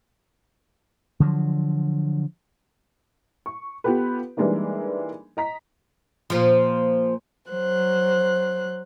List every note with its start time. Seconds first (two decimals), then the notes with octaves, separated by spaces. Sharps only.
1.20 D3 F3 F#3
3.46 C#6
3.84 B3 F4 G4 A4 B4
4.37 E3 G3 G#3 A#3 D4 D#4
5.37 D#5 A#5 B6
6.30 A#2 F3
7.49 F#3 C5 F#6